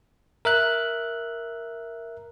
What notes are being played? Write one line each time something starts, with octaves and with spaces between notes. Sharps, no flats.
A#4 E5 F#6